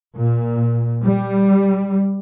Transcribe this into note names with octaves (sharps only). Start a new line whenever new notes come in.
A#2
G3